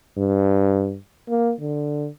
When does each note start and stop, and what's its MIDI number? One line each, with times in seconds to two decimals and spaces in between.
0.18 0.97 43
1.29 1.52 58
1.61 2.07 50